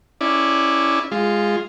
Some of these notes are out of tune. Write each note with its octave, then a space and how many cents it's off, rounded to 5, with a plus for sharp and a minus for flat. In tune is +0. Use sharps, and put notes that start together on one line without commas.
C#4 +0 E4 -10 D5 +5
G#3 -10 F4 +0